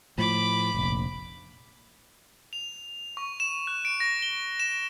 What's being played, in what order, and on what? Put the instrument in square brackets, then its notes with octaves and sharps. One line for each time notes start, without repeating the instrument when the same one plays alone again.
[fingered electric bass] A2 F3 [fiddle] B5 D6
[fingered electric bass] F1 A#1
[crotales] F7
C#6
E7
F#6
D7
A#6
G7
E7